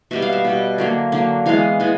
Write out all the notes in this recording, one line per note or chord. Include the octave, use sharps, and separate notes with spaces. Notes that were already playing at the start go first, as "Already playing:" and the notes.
B2 G3 B3 E5
F5
E5
B2 G3 B3
D3 F#3 A#3
D3 F#3 A#3
E3 G#3 B3 F5
E3 G#3 B3